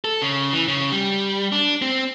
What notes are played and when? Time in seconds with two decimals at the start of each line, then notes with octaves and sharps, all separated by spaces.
0.04 A4
0.22 C#3
0.53 E3
0.68 C#3
0.92 G3
1.52 D4
1.82 C4